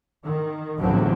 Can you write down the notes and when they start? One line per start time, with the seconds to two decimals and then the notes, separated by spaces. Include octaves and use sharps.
0.25 D#3
0.79 A1 E2 D3 F3 F#3 C4